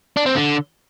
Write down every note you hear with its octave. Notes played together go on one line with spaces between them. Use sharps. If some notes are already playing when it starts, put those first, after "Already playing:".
D4
C4
D3